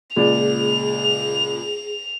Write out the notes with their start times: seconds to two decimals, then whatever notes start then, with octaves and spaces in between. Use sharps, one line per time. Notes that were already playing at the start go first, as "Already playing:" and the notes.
0.16 C#2 A#2 G#4 D5 F7